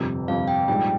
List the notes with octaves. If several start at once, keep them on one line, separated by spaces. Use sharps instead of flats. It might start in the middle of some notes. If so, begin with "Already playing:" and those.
Already playing: G1 F2 C3
G1 F2 C3 F5
G5
A#1 G#2 G3 G5